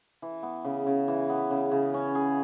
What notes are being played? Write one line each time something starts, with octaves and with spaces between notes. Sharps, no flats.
E3
B3
C#3
C#3
E3
B3
C#3
C#3
C#4
G#4